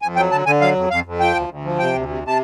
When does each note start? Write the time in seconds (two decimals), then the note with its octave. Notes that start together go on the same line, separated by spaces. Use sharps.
0.02 F2 G#5
0.16 F#3 G5
0.32 D3 A5
0.46 D3 G#5
0.61 F#3 F5
0.75 F2
0.90 F2 F5
1.05 F2
1.19 F3 G5
1.35 D2
1.49 D2
1.64 F3
1.79 C3 G5
1.93 D2
2.08 C3
2.23 C3 A5